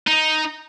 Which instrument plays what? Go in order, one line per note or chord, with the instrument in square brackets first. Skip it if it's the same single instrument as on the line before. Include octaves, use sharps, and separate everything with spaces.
[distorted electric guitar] D#4